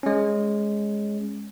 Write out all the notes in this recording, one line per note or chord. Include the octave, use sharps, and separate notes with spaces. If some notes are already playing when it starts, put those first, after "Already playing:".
G#3 C#4